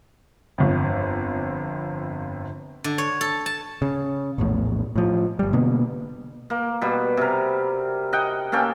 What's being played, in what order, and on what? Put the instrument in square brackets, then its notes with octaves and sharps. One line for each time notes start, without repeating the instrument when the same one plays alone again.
[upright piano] G1 F2
[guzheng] D3
C#5
A4
A5
[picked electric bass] C#3
A#1 E2 A2
A2 F3
G1 G3
B2 D3 A#3 B3
[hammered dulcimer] A#3
B2 G3
C3 A#4
D#5 F#5 G5
A#3 C#4 A4 G5